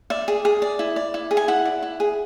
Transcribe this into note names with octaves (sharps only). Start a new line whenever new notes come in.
D5 E5
G#4
G#4
D5
E4
D5
E4
G#4
G#5
E4 F#5
D5
E4
G#4